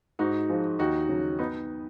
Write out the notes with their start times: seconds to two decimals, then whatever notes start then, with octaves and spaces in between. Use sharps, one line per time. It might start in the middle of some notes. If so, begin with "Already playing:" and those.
0.19 G#2 D#4 F#4
0.49 F3 G#3
0.79 D#2 D#4 F#4
1.09 C#3 F#3
1.39 B3 D#4